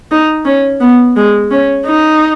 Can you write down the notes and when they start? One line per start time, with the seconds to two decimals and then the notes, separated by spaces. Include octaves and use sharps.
0.11 D#4
0.45 C#4
0.80 B3
1.16 G#3
1.51 C#4
1.86 D#4